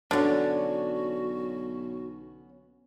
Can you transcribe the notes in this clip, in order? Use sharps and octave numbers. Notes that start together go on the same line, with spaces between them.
B1 D3 B3 C#4 F#4